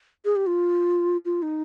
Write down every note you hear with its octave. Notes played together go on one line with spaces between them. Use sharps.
G#4
G4
F4
F4
D#4